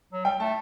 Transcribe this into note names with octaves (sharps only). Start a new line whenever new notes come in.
F#3
G3 G5
A3 A5